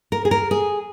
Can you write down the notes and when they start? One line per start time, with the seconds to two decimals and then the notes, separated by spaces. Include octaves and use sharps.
0.12 A#4
0.25 G#4
0.31 A#4
0.51 G#4